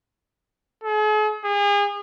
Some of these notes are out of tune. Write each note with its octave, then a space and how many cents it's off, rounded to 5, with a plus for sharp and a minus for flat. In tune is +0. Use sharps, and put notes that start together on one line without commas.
G#4 +45
G#4 -35